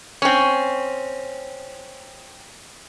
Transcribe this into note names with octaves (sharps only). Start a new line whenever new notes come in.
C4 C#4